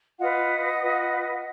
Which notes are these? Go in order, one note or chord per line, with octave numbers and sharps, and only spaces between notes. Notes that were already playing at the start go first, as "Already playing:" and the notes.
F4 B4 D#5 F#5
F4 B4